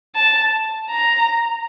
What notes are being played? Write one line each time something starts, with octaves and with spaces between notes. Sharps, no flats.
A5
A#5